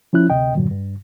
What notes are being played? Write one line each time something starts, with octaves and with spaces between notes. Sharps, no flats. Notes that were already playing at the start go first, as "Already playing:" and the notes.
F3 C#4 E4 F#6
D2 C3 D#5 G5
E2 G2 A#2 D3 F#3
G2